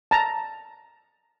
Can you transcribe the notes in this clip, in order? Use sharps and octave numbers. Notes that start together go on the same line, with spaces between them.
A5 A#5